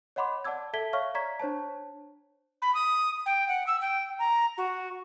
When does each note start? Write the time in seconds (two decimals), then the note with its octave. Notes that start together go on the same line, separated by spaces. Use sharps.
0.16 C#5 D#5 F#5 B5 C6 D6
0.44 D5 F#5 A5 D6 E6 G#6
0.73 A4 E5 A5 G#6 B6 G7
0.93 C#5 E5 F5 C#6 F6
1.15 D5 A#5 C#6 G#6 B6
1.39 D4 C5 C#5 A5
2.62 B5
2.74 D#6
3.26 G5
3.48 F#5
3.67 E6
3.81 G5
4.19 A#5
4.57 F#4